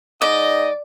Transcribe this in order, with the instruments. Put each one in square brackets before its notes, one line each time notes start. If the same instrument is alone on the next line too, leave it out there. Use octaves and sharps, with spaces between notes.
[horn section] G#2 D#4 D#5 [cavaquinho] D5